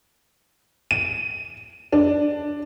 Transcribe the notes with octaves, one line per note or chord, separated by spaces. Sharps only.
D#7
D4